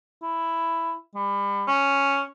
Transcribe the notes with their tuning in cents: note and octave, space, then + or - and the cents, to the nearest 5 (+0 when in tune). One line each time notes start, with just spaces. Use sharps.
E4 +5
G3 +35
C#4 +0